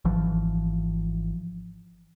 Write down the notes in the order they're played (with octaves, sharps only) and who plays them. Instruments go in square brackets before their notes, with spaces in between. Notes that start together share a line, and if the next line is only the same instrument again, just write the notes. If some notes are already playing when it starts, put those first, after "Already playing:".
[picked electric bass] G#1 E3 F3